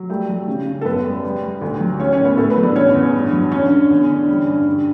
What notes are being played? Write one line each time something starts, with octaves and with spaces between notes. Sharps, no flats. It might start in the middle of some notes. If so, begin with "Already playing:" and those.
Already playing: F#3
G3 A3 G4
F#3
C#3
C#3
A4
F#2 B3 B4
G3
G3
G3
D2
F#3
A3 C#4 C#5
C#4 C#5
A2
B3 B4
A2 A3 A4
B3 B4
F#3
D4 D5
E2 C#4 C#5
E2
G2
F#3
D3 C#4 C#5
D3
E2
D3
G3
G2
D3